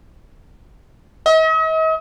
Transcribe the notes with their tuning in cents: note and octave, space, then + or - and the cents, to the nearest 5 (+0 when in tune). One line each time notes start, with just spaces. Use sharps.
D#5 +45